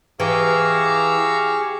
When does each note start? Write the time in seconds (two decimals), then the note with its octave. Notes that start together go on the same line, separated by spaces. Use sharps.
0.20 E3 G4 G#4 F5 A#5 C#6 E6